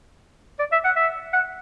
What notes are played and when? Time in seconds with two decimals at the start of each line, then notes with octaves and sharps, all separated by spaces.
0.59 D5
0.72 E5
0.85 F#5
0.96 E5
1.33 F#5